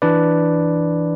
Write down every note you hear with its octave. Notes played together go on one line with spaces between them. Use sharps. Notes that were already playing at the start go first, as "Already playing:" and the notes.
E3 D4 B4 D5